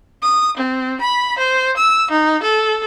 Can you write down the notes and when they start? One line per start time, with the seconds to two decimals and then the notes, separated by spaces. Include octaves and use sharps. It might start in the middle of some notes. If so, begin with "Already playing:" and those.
0.22 D#6
0.57 C4
1.01 B5
1.39 C5
1.77 E6
2.11 D#4
2.43 A4